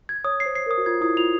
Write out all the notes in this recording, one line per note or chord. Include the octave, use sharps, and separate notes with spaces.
G#6
C#5 D#6
C7
C5
C7
A#4
D#6
F#4
F4 G#6
E4 D#6
F4 F7